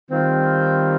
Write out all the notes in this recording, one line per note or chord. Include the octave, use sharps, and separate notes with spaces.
D#3 G3 C4 F4